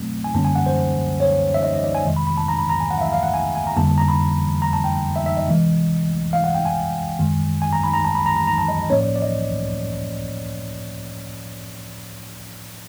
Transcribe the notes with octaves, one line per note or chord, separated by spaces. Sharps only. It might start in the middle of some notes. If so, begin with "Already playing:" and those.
Already playing: B2 F#3 A3 C4
G#5
F#2 D3 G3 A#3 C#4 A5
G#5
F#5
C5
C#5
E5
D#5
D#5
D5
G#5
F2 C3 D#3 G#3
B5
B5
A5
A#5
B5
A#5
G#5
F#5
F5
E5
F5
F#5
G#5
G#5
A#5
F2 D3 G3 A#3 A5
A5
A#5
B5
A#5
A5
G5
E5
E5
D#5
C3 E3 G#3
F5
F#5
G5
G#5
F#2 D#3 G#3
G#5
A#5
B5
A#5
A5
B5
A#5
A#5
A#5
A5
D#5
D#5
A2 F3 A#3 C#4 C#5
D5
D5
D#5